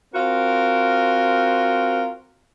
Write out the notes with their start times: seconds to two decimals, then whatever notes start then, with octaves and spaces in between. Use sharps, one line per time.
0.13 C4 F4 F#4 A#4